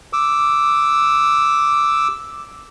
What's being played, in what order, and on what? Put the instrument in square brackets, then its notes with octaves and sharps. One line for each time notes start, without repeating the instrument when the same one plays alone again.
[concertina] D6 E6